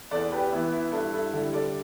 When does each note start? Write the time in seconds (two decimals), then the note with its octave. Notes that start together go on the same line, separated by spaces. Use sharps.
0.11 E2 A4 D5
0.32 G4 B4
0.52 E3 B3 E4
0.72 E4
0.92 G2 E4 A4
1.13 E4 A4
1.33 D3 G3 E4 A4
1.53 A4 D5